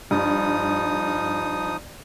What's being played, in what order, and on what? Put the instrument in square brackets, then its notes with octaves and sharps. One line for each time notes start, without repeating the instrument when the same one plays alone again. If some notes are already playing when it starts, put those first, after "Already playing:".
[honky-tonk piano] G2 [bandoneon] F3 D#4 D#6